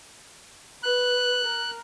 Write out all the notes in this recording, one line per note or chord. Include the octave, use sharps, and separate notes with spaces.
B4 F#6
A#4